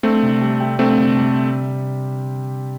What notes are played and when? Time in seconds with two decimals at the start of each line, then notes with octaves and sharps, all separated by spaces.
0.03 A3 C4 D4
0.23 C3
0.41 G3
0.60 G4
0.79 A3 C4 D4
0.98 C3
1.17 G3